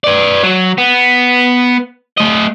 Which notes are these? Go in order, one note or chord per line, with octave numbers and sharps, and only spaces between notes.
B4 D5
F#3
B3
A3 D#5